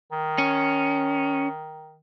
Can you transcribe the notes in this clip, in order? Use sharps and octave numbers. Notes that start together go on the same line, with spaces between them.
D#3
C#4